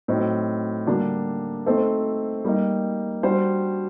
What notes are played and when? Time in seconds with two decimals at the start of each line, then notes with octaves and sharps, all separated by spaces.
0.08 A2 F#3 C4 D#4
0.87 D3 G3 A#3 D4
1.66 A3 C4 D#4 A4 C5
2.45 G3 A#3 D#4
3.23 G3 D4 F#4 C5